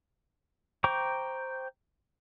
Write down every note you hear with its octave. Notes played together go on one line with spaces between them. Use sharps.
C5 G5 A#5 C#6 D6